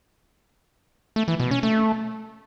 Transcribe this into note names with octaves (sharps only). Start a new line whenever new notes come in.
A3
E3
B2
C#4
A3